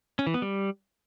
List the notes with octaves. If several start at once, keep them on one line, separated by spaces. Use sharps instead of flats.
C#4
E3
B3
G3